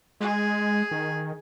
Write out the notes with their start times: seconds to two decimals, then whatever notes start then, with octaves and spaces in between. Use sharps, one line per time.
0.20 G#3 G#4
0.91 D#3